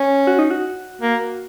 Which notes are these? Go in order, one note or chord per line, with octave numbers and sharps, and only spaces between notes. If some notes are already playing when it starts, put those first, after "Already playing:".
Already playing: C#4
F#4
D#4
F#4
A#3